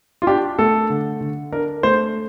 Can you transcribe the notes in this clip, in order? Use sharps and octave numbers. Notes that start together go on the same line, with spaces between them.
F4
D4 G4
A3 A4
D3
D3
D4 A#4
A3 C5